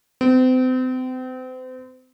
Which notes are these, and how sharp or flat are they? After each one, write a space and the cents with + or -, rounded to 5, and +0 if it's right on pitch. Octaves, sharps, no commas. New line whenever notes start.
C4 -35